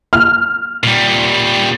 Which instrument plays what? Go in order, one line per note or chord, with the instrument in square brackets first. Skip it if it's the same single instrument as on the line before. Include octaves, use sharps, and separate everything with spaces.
[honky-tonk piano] F6
[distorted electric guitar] A#2 G3